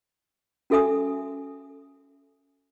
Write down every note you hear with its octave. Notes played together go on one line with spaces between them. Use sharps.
C#4 F#4 A4 E5 G#5 D#6